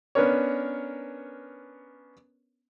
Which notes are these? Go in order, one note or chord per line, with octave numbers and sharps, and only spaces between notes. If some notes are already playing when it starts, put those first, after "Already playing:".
B3 C#4 D4 A#4 C#5